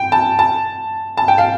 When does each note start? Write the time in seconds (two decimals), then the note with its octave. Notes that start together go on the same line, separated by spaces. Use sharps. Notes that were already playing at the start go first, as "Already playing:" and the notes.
Already playing: G5
0.12 A5
0.39 A5
1.17 A5
1.28 G5
1.38 F5